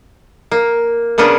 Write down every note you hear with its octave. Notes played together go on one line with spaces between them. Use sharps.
A#3
C#3 A#3 B3 C#4 D4